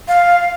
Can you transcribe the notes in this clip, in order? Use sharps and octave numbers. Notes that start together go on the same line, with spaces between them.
F5